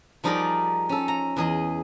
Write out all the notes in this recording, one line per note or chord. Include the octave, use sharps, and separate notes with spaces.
F3 G3 D#4 G#4 A#4 D5
C#4 A4
A#5
E2 G#4 D#5